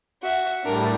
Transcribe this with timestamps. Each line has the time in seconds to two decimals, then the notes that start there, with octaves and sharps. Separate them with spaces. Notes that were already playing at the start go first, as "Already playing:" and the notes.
0.22 F#4 E5
0.64 A2 G3 D4 A#4